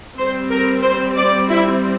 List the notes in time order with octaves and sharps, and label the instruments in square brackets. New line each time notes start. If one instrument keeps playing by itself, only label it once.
[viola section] G3 C4 C5
A#4
C5
D5
E4